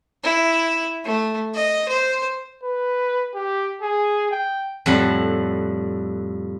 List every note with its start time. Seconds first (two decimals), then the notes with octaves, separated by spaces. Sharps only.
0.24 E4
1.04 A3
1.54 D#5
1.89 C5
2.64 B4
3.35 G4
3.82 G#4
4.31 G5
4.86 F2 A2 G3 F#5 B5